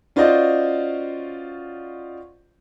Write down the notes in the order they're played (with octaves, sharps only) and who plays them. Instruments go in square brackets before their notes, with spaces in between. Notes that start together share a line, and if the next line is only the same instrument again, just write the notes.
[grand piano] C#4 F4 F#4 C5 D5 D#5